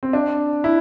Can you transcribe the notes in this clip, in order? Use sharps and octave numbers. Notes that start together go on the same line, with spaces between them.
C4
D4
E4